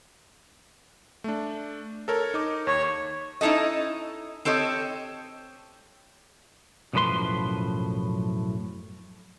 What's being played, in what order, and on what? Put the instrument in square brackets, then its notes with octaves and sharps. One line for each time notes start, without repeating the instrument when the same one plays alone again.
[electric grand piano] A3 D4
A4 A#4 C#5
D#4 D6
[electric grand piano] D#2 [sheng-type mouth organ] C#5
[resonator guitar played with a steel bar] C#4 D#4 E4 A4 D#5
C4 G4 A4 C#5 D#5
[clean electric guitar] B1 F#2 A2 F3 B4 C6